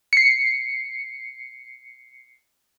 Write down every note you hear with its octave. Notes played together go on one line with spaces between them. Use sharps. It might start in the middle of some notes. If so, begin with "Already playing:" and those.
C7 C#7